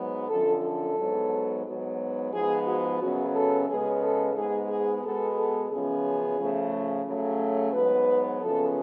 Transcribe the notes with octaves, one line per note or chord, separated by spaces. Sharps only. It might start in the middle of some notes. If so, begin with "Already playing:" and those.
Already playing: G#2 F#3 B3
F#2 D3 F3 A4
A4
G#2 F#3 B3
G#2 F#3 B3
G#2 F3 B3 G#4
F#4
F#2 C#3 F#3 B3 F#4
A4
C#3 G#3 B3 G#4
A4
G#2 G#3 B3 G#4
G#4
B2 G#3 B3 A4
A4
F#2 C#3 F3 B3 G#4
C#3 F3 A3
C#3 F#3 A3
G#2 F#3 B3 B4
F#2 C#3 F3 B3 A4